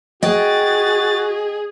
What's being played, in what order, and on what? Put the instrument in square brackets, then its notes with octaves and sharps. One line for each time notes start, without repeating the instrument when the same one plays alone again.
[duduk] F#4 [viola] G#4 [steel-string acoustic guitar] D#5 G5 [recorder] A6